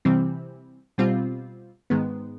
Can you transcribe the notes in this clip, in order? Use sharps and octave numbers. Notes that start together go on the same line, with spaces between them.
C3 E3 G3 C4
B2 G3 C4 F4
G#2 D#3 G#3 B3